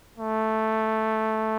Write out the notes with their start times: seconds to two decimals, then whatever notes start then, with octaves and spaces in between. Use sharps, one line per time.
0.19 A3